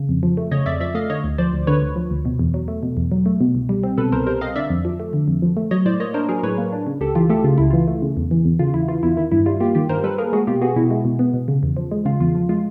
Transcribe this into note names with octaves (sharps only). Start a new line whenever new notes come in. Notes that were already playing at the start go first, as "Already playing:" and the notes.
Already playing: C#3
F2
F3
A3
C#3 C#5 D#5
F2 D5 E5
F3 D5 E5
A3 D#5 F5
D3 C#5 D#5
D2
F3 C5 D5
D2
D3 B4 C#5
D2
F3
D2
B2
E2
F#3
A3
B2
E2
F#3
A3
B2
C2
G3
C4
B2 A4 B4
C2 A#4 C5
G3 A#4 C5
C4 D#5 F5
D3 D5 E5
F2
F3
A3
D3
F2
F3
A3
F#3 C#5 D#5
A2 C5 D5
A#3 C#5 D#5
D4 A#4 C5
F#3 G#4 A#4
A2 B4 C#5
A#3
D4
C#3
C#2 G4 A4
E3 F4 G4
A3 G4 A4
C#3 F4
C#2 E4
E3 F4
A3
C#3
E2
E3
E2
C#3 F4
E2 E4
E3 F4
E2 E4
D#3 E4
G2 E4
G3 F4
A#3 F4 G4
D#3 F4 G4
G2 A#4 C5
G3 A4 B4
A#3 G#4 A#4
G#3 F#4 G#4
B2 F4 G4
B3 F#4 G#4
B2 E4 F#4
G#3
B2
B3
B2
C#3
E2
F3
G#3
C#3 F4
E2 F4
F3
G#3 F4